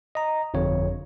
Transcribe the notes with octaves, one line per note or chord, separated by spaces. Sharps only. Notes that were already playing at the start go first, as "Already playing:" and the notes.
D#5 A#5
G1 F2 D3 C#5